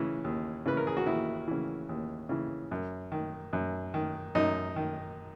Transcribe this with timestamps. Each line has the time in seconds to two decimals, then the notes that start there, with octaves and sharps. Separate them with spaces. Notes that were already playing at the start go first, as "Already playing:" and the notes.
Already playing: C#3 E3
0.24 D#2
0.66 C#3 E3 B4
0.77 A#4
0.87 G#4
0.97 F#4
1.06 D#2 E4
1.48 C#3 E3
1.89 D#2
2.29 C#3 E3
2.71 F#2
3.12 D#3
3.53 F#2
3.94 D#3
4.35 F#2 D#4
4.76 D#3